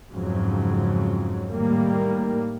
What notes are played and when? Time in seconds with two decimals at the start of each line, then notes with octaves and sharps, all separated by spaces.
0.13 F2 G#2 C#3 F#3
1.52 A2 D#3 G3 A#3